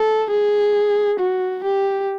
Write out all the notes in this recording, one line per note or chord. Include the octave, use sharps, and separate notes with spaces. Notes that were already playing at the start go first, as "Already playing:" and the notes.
Already playing: A4
G#4
F#4
G4